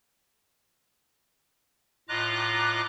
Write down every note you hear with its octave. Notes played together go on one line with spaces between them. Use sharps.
A2 F4 D#5 A#5 D6 F#6